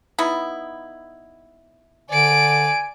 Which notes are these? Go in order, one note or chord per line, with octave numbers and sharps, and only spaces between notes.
B3 D#4 E4
D3 D5 G#5 D7